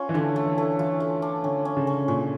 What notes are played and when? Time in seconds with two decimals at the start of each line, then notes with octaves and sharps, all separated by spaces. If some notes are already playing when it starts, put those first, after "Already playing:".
Already playing: C#4 F4
0.09 E3
0.14 D3 A3
0.36 A3
0.46 E3
0.58 A3
0.79 E3 F4
1.00 A3
1.22 D4
1.43 D3 C#4
1.65 C#4
1.77 C#3
1.87 C#4
2.08 A#2 C#4